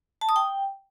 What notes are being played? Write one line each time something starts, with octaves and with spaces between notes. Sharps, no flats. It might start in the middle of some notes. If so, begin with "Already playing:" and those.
A5
D#6
G5